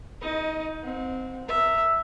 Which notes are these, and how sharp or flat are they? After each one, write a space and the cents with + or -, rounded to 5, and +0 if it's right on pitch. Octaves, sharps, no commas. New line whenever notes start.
D#4 +25 D#5 +0
C4 -15 F#5 -40
E5 +0 A#5 -25